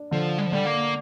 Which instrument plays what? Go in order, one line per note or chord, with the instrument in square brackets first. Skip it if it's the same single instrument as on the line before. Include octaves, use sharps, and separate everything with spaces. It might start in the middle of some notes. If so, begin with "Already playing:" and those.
Already playing: [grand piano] D4
[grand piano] D3 [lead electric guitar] F3
[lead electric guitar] G3
F3
[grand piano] D3 [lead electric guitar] G3
[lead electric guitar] A#3